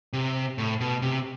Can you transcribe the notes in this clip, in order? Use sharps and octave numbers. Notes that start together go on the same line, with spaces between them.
C3
A2
B2
C3